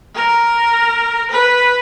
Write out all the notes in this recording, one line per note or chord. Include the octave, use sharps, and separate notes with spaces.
A#4
B4